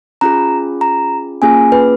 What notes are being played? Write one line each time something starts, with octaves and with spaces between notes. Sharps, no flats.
C#4 F4 G#4 A#5
A#5
A#3 C#4 F4 G#4 G#5
B4